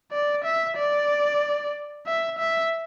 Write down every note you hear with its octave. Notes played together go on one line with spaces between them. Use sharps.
D5
E5
D5
E5
E5